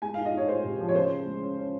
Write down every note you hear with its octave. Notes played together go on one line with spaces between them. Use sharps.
G#3 G#5
F5
D#4
D#5
D#4 C#5
G#3 C5
C3
F3
C#5
C#3 C5
C#3
G#3
C#4
C#4